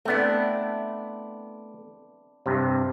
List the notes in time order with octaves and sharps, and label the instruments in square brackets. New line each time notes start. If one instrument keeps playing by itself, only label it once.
[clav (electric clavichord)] A3 B3 [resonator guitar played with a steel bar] C4 D4 E4
[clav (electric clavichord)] G2 C3